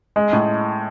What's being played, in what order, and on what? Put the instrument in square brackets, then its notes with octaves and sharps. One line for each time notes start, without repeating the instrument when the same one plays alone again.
[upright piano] G#3
A2